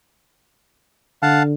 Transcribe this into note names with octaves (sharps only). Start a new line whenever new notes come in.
D3 F5 F#5 A5